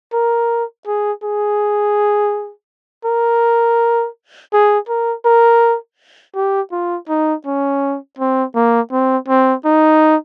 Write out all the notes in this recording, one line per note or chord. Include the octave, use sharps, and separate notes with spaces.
A#4
G#4
G#4
A#4
G#4
A#4
A#4
G4
F4
D#4
C#4
C4
A#3
C4
C4
D#4